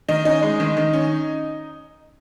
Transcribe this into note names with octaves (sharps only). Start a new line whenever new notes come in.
D#3 D#4
C#4 D#4
G#3
D#3
D#3
C#4